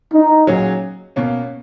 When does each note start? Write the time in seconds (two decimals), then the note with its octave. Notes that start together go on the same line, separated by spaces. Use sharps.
0.13 D#4
0.47 A#2 F#3 C#4 G#4
1.16 B2 A#3 C#4